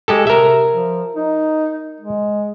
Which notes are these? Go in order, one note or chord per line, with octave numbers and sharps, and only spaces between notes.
G#3 G4 A4
C3 A#4 E5
F3
D#4
G#3